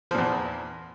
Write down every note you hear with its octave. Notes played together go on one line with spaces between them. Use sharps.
E2 A#2 F3